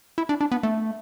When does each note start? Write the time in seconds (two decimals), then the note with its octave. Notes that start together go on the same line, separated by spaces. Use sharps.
0.18 E4
0.29 D4
0.41 D4
0.51 B3
0.63 A3